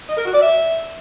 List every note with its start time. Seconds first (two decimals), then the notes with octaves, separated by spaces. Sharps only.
0.09 D#5
0.17 A#4
0.25 F#4
0.34 D5
0.42 E5